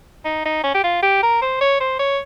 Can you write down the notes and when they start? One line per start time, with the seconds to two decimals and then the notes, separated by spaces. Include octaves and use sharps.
0.25 D#4
0.45 D#4
0.63 C#4
0.74 G4
0.83 F4
1.02 G4
1.23 A#4
1.42 C5
1.61 C#5
1.80 C5
1.99 C#5